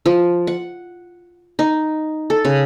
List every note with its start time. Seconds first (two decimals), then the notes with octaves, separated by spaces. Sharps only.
0.06 F3
0.47 F#5
1.59 D#4
2.30 A4
2.45 C#3